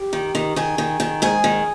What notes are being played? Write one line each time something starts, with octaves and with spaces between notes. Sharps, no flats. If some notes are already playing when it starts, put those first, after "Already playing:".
Already playing: G4
D#3
D#3
D#3 G#4
D#3
D#3
G#2 G#4
D#3